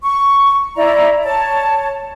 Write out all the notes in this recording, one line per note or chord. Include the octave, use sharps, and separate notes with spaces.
C#6
E4 D5 A#5
C#5 A5